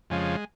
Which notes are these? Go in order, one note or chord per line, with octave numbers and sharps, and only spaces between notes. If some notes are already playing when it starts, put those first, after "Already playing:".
F2 C#3 F3 G#3